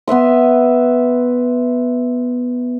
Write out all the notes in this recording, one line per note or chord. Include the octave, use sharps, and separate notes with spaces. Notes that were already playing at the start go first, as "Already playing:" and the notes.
B3 B4 E5 C6